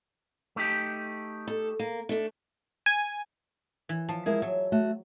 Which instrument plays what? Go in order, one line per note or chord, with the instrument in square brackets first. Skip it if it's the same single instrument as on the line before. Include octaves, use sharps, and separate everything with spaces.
[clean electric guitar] A3 D#4 G4
[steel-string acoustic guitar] A4
A#3
A3 D4
[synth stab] G#5
[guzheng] E3
[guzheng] F3 [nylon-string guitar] A5
[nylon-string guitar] G#3 E4 A#4 [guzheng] G#4
[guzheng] F#3 [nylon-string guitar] E5
[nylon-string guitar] A3 F#4